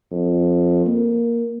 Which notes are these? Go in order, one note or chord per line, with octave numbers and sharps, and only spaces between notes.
F2
A#3